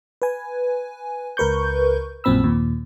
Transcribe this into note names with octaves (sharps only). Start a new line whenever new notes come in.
B4 G#5
C#2 A#4 B4 C#6 G6
A#1 F#2 A#2 C4 B5 E6
D#2 A#2